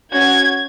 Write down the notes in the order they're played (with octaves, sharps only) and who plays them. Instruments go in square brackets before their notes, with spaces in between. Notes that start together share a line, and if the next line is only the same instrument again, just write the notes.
[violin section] C#4 F#4 G#6